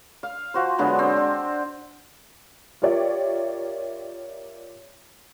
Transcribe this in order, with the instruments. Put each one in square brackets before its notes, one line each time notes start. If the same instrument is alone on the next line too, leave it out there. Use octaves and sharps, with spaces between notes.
[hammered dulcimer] F5
F3 F#4 C5
D3 F#3 G#3 B3
C4
D4
[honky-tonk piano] F4 G4 A#4 C#5 D5 E5